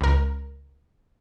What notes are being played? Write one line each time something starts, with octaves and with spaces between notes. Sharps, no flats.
C#2 A#4